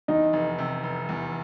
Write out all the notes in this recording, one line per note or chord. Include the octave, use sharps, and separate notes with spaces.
E2 D#4
F1
C3
F1
E2